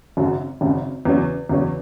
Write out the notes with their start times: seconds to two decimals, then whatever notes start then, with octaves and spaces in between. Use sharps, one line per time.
0.17 G#1 F#2 C#3 F#3
0.61 G#1 F#2 C#3 F#3
1.05 E2 C#3 F#3 C#4
1.49 E2 C#3 F#3 C#4